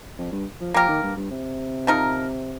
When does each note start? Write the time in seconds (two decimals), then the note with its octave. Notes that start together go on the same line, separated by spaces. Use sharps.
0.18 F2
0.32 G2
0.61 F3
0.74 F3 A#3 G4 A#4
0.88 D#3
1.03 G2
1.16 G2
1.31 C3
1.87 F3 D#4 A#4